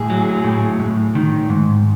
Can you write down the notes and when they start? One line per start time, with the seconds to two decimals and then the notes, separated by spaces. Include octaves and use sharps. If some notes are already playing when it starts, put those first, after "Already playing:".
Already playing: A2 G#4
0.10 F#3
0.44 A2
0.80 A2
1.15 D#3
1.50 G#2